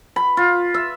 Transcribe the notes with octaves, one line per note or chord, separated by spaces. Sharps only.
B5
F4
E5